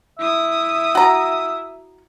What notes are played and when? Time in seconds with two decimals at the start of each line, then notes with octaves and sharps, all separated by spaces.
0.19 E4 E5 D#6
0.95 F#4 A#5